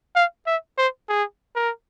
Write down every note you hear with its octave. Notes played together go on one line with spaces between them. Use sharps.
F5
E5
C5
G#4
A#4